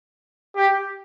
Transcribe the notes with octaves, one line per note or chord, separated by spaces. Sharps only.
G4